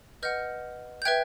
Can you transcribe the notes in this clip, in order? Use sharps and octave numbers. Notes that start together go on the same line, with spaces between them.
B4 D#5 F#5 F6 G6
G6
B4 E5 G5 F#6 G#6